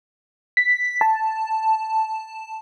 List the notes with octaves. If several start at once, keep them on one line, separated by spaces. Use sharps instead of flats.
B6
A5